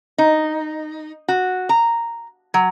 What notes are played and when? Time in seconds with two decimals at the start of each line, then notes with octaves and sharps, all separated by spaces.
0.18 D#4
1.28 F#4
1.69 A#5
2.54 F#3